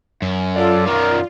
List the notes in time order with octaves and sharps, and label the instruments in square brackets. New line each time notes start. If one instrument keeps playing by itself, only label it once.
[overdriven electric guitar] F#2
[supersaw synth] F4 [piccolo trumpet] A4 [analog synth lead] D5
[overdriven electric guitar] F#2 D#3 [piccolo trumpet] A#4